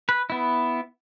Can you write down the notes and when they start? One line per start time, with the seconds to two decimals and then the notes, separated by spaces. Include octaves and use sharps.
0.09 B4
0.30 B3 E4